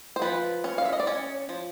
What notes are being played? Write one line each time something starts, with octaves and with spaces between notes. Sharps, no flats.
C5
F3 B4
C#4
F5
E5
D#5
D5
C#4 C#5
F3